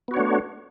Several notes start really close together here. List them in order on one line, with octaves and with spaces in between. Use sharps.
B3 F#4 C#5 D4 A3